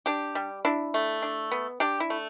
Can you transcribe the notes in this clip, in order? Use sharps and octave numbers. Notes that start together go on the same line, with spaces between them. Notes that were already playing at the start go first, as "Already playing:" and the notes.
D4 G4
G3
D4 E4
A3
D4
B3
D4 G4
E4
A3